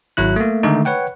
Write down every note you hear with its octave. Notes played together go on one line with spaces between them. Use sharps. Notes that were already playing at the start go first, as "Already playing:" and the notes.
G#1 F#3 E4 F#6
A3 A#3
D3 D#3 G#3 A3 D#4
B4 C#5 F#5 G5